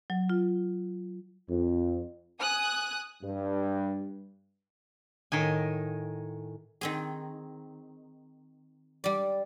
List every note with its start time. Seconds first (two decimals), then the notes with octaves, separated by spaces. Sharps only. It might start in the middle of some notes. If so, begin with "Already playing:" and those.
0.10 F#3
0.30 F4
1.50 F2
2.39 G#5 D#6 F#6
3.23 G2
5.32 A2 D#3 D#5 G#5
6.81 D#3 C4 G#4
9.04 G3 D5